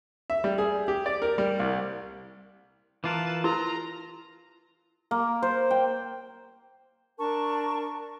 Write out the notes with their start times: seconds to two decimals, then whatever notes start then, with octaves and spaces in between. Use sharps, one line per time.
0.30 E5
0.44 G3
0.58 G#4
0.88 G4
1.06 D5
1.22 A#4
1.38 G3
1.59 C2
3.04 E3 F4 A#4 B4 A5
3.44 E4 F4 A#4 A#5 C6
5.11 A#3
5.42 C5
5.71 G5
7.18 D4 A#4 A5 C#6